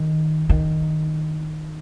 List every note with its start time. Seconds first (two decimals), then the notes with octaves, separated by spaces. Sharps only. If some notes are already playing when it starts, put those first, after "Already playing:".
Already playing: D#3
0.49 D#3